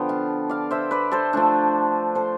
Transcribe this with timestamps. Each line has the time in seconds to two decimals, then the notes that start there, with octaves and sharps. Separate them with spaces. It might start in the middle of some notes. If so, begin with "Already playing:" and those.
Already playing: D3 F3 B3 G5
0.09 F5 A5
0.49 D5 F5
0.71 C5 E5
0.91 B4 D5
1.12 A4 C5
1.33 F3 A3 D4
2.15 A4 C5